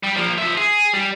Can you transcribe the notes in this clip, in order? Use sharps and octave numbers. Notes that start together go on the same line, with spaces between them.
G3
F3 A#3
F3 E5
G#4
G3